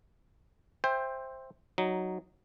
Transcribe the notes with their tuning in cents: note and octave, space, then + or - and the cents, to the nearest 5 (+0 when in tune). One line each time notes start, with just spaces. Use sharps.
C5 +10 E5 +0 G5 +20
F#3 +0 D#4 +0